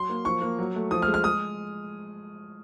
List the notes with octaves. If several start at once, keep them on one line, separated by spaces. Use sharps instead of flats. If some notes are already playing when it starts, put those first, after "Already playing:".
Already playing: F#3 C6
A#3
F3 C#6
A#3
F#3
A3
F3 D#6
F6
G#3
F6
G#3 D#6